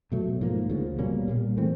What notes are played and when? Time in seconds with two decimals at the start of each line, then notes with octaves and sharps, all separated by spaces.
0.12 B2 F#3 A3
0.41 G#2 F3 A#3
0.69 D2 C#3 F3
0.98 B2 G3 A#3 C#4
1.28 A#2 G3 A#3
1.57 E3 A3 C4